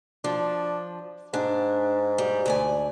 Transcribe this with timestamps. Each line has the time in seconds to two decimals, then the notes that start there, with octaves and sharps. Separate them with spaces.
0.24 F3 D4
1.34 G#2 D4
2.18 G3
2.46 D2 D5 G#5